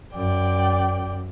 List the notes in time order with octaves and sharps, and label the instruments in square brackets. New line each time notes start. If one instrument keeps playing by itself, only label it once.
[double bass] F#2 [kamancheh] D5 G5